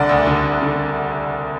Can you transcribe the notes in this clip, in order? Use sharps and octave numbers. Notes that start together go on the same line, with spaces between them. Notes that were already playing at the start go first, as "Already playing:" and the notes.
Already playing: C2 D3 D5 F#5
D2
D3
D2
D3